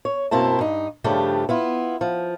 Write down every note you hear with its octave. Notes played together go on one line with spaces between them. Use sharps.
C#5
F#2 B2 A#3 C4 E4 A5
G2 D#4
G2 C#3 F3 A3 D4 G4
B3 E4 F4
F3